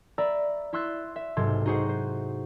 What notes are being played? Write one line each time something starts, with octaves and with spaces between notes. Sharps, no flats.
D5 E5 A#5 B5 E6 A#6
E4 E5 C6 E6 F#6 A6
E5
B1 G#2 C3 A4 C6 G#6
D#4 F#4 G#4 C5 F#5
C5